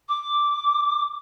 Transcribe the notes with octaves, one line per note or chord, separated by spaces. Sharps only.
D6